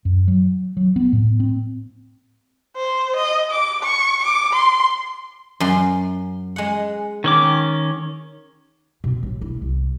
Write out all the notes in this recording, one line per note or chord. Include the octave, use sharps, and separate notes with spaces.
F#2
F#3
F#3
B3
A2
C4
C5
D#5
D6
C#6
D6
C6
F#2 C6
G#3 F#5
D#3 C#4 D6
B2
A1
E4
C2